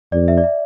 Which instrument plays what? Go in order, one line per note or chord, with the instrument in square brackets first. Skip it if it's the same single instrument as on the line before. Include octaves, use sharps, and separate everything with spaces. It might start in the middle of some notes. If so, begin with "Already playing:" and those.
[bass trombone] F2 [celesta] D5
[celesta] E5
D5
E5